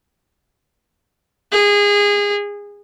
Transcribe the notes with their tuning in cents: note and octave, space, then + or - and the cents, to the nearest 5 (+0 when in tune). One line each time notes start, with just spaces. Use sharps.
G#4 -25